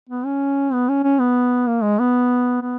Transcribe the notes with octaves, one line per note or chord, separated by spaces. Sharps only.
B3
C#4
B3
C#4
C#4
B3
A#3
G#3
B3
B3